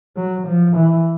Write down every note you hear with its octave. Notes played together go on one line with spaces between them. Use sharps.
F#3
F3
E3